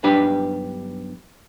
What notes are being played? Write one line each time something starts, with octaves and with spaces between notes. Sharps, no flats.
B1 G2 D4 G4 B4 B5